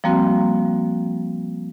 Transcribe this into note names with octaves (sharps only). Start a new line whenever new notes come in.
F3 G3 A#3 C4 F#4